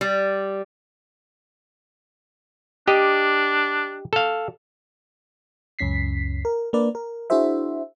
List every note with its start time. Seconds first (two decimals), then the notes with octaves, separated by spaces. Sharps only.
0.01 G3
2.88 D4 G4 D#5
4.13 A4 F5
5.79 C#2 F#2 C#4 B6 C7
6.45 A#4
6.73 A#3 D4 A#4 B4 D5
6.95 A#4
7.30 D4 E4 F#4 G#4 C5 E5